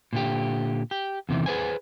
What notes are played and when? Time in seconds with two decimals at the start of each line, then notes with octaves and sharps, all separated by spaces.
0.13 A#2 D3 G4
0.91 G4
1.29 E2 C3 D#3 E3
1.46 G#4 B4 C5 G#5